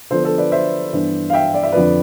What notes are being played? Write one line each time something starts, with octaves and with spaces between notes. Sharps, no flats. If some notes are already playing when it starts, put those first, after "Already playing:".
D3 F3 B3 D4 A4 C5
A4 C5
B4 D5
C5 E5
G2 E3 B3 D4
F5
E5 G5
D5
E5
F2 D3 F3 B4 D5